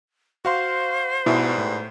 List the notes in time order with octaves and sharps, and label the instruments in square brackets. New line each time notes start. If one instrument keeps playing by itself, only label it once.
[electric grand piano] F#4 F5 C6 [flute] C5
[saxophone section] G#2 G3 B4 [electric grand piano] B2 [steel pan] E4
[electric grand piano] A2